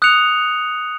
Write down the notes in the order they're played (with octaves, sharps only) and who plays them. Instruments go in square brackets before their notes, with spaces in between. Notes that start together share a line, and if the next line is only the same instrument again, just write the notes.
[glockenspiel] D#6 F#6 C#7 F7